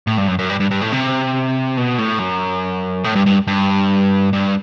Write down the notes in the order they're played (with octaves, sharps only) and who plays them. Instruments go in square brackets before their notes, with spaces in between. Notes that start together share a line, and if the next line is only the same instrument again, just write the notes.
[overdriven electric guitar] A2
G2
F#2
F#2
G2
G2
G2
A2
C3
B2
A2
F#2
A2
G2
G2
G2
G2